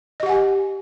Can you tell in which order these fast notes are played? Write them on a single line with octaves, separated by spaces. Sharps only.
D#5 G4 F#5 G#5